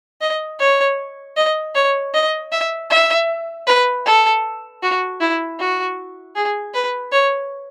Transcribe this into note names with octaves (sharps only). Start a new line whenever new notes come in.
D#5
C#5
D#5
C#5
D#5
E5
E5
B4
A4
F#4
E4
F#4
G#4
B4
C#5